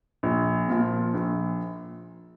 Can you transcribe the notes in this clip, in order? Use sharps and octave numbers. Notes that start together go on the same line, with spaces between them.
A#1
A#2 F3
A#1